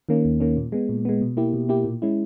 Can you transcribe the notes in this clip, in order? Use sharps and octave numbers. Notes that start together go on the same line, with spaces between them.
D#3 A#3 C#4
D#2
D#3 A#3 C#4
A#2
G#3 B3
A#2
G#3 B3
B2
A#3 E4 G4
B2
A#3 E4 G4
A#2
G#3 C#4 E4